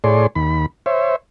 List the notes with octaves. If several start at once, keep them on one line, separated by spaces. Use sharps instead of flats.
A2 G#4 C#5 D5 C6
D#2 B5
C5 C#5 E5